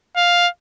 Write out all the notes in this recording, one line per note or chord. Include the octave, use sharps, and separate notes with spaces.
F5